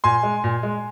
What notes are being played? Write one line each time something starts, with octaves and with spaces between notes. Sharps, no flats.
A#2 G#5 C6
G#3
A#2
G#3